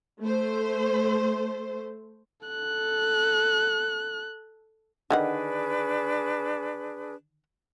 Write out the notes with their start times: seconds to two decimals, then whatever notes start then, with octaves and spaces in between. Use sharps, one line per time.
0.21 A3 C5
2.47 A4 F#6
5.10 D3 D#3 D4 G#4 B4 F#5